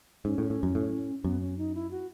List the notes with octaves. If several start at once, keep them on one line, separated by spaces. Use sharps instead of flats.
G#2 C#4
A2
A2
F#2
A2
F#2 B3
C#4
D#4
E4
F#4